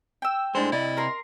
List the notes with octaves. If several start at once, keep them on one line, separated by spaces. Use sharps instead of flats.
G5 E6
A2 G#3 D4 C5
C3 E4 D5 D#5
A#4 A#5 C6